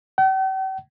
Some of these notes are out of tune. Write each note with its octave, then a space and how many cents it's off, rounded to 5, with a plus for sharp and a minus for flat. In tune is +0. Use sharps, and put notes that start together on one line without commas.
G5 -45